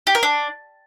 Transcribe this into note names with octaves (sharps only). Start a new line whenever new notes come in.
G4
A#4
D4